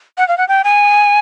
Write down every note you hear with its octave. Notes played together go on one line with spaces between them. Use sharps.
F#5
F5
F#5
G5
G#5